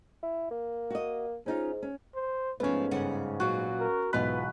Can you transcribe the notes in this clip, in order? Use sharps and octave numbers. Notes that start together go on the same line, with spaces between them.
E4
A#3
F#4 D#5
G#2 C#4 D#4 F4
C#4
C5
G#2 F3 A3 B3 C#4
G2 C#3 F#5
A#2 F#3 F#4
A#4
B1 G#2 E3 G#3 B3 F4 B4